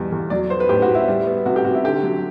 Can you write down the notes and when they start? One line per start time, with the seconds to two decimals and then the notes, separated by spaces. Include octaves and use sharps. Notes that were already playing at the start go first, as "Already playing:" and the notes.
Already playing: E2 B2 G3
0.12 E2
0.30 F#3 D5
0.50 B3 C5
0.60 B4
0.69 A2 G4
0.82 F#4
0.88 A2
0.95 E4
1.08 G3
1.26 B3
1.46 C3 F#4
1.56 G4
1.64 C3 F#4
1.75 E4
1.84 D3 G4
2.03 F#3